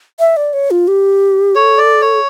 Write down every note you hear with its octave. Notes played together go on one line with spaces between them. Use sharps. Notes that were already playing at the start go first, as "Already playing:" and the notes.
E5
D5
C#5
F4
G4
A4 C#5
D5
C#5